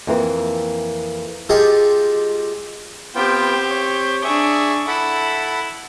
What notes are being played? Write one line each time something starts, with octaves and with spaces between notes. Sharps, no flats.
F2 E3 A#3
G#3 F4 G4 A4 D#5
B3 C4 F4 G4 G5
C#5
D4 G#4 E5 C#6 D#6
E4 A4 F#5 B5